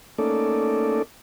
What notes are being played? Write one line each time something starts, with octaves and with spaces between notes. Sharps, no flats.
A3 A#3 C#4 D#4 A4 D5